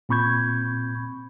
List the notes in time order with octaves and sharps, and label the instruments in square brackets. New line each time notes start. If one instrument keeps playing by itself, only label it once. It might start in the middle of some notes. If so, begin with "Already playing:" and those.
[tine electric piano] A#2 C4 B5 C#6 G6 G#6